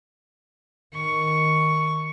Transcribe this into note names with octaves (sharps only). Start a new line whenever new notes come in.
D#3 C#6